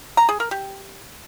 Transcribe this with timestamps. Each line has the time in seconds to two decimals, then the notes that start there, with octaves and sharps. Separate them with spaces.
0.17 A#5
0.29 G#4
0.40 A#4
0.51 G4